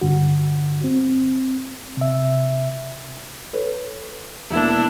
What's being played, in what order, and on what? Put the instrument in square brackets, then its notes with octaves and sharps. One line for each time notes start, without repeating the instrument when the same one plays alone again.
[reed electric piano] G2 D3 F#4
C4
C3 E5
[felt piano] A4 B4 C#5
[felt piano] E1 A#3 [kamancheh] D4 E4